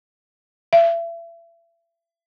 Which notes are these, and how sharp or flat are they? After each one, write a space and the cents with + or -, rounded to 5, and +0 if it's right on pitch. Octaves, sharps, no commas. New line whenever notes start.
E5 +35